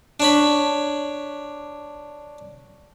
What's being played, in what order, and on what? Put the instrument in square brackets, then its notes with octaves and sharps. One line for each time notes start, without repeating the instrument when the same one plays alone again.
[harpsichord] D4 C#5 B5